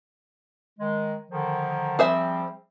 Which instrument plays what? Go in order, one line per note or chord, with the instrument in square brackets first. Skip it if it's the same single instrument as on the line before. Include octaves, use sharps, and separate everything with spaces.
[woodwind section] D#3 G#3
D3 D#3 F3
[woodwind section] F3 G3 C4 [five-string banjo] G#4 C5 E5